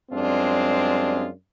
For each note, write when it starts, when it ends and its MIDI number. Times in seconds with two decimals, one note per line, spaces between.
0.11 1.28 42
0.11 1.28 55
0.11 1.28 56
0.11 1.28 60
0.11 1.28 62
0.11 1.28 65